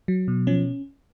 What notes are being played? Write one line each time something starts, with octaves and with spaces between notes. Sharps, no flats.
F#3
B2
F3 C#4